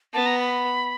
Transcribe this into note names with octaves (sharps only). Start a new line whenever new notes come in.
B3 A5
A#5
B5